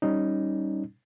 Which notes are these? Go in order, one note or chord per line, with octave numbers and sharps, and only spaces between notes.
G3 C#4 D#4